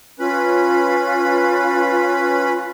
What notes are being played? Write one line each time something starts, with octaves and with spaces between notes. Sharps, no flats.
C#4 F4 B4 B5